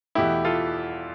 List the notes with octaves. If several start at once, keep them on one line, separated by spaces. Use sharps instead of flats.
E2 B2 A3 E4 G4
F4 A4